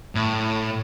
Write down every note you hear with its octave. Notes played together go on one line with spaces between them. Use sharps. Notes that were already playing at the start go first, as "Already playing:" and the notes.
A2